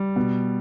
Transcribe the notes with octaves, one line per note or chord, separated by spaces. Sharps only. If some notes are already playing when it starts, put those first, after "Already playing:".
Already playing: G3
B2